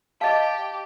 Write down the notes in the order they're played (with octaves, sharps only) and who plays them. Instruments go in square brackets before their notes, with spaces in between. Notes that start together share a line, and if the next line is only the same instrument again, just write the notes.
[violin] G4 [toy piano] D#5 F5 [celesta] A5